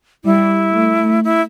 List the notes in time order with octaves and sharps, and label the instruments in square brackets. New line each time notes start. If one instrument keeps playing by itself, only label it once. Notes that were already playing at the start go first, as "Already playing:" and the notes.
[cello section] G3 [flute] E4
[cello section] A3
[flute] E4